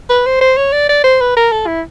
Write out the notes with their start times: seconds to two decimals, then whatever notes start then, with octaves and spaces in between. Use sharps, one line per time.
0.10 B4
0.26 C5
0.41 C5
0.57 C#5
0.72 D5
0.89 D5
1.04 C5
1.21 B4
1.37 A#4
1.52 A4
1.67 E4